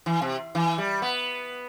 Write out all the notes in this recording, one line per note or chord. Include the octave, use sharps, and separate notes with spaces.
E3
C3
E3
G3
B3